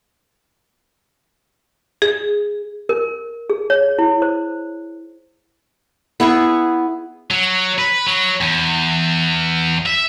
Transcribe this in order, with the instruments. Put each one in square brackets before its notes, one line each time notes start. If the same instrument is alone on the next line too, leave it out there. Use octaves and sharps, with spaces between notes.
[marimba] G#4
[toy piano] A#4
G#4
C#5
E4
C5
[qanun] B3 E4 G#4 C#6
[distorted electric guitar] F#3
B4
F#3
E2
E5